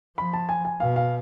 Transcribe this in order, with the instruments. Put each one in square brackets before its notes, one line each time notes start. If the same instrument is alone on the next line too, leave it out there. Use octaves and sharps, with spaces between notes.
[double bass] F3 [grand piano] B5
[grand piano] A5
G#5
G#5
[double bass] B2 [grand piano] F5
[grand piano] F5